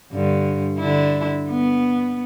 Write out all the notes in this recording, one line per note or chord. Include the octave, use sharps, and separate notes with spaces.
G2 D3
D3 D4 E4
B3